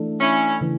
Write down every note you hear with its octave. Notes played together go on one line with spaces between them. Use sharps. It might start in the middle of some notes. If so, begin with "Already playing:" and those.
Already playing: E3 A3 D4 A4
C#4 E4
C#3 E3